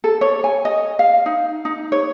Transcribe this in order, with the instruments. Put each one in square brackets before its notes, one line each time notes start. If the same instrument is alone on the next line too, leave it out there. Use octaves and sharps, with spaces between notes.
[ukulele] A4
C#5
G#5
D#5
F5
D#4
D#4
C#5